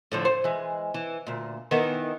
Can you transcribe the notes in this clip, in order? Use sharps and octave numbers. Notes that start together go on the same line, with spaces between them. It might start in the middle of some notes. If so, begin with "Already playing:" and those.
A2 D3 F3
C5
E3 G#3
E3
D2 A#2
D#3 E3 B3